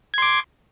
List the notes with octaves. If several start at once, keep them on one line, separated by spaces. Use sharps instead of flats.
C6 D6 G#6